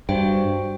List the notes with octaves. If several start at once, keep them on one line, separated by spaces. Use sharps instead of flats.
G2 F#4 C5 G5